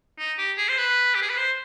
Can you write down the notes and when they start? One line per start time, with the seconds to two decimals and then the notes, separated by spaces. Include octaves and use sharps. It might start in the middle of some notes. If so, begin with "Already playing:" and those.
0.19 D#4
0.38 G4
0.58 G#4
0.69 C5
0.78 B4
1.15 G4
1.22 G#4
1.30 B4
1.37 C5